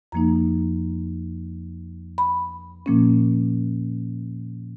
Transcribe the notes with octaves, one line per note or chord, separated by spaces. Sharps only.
F2 F3 A#3 D#4 A#5
B5
A#2 F3 A#3 C#4